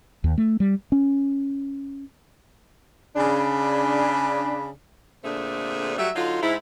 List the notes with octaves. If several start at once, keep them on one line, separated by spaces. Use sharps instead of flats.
D#2
A3
G3
C#4
C#3 D4 B5
A#2 D3 A3 C4 D4 G#4
F#3 G3 A3 F#4 E5
D3 F#3 D#4 F4
G#2 E4